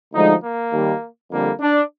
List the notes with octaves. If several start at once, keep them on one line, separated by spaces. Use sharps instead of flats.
D2 D3 F3 G#3 D#4
A#3
D#2 D#3 G3
F2 D3 G3 A#3
D4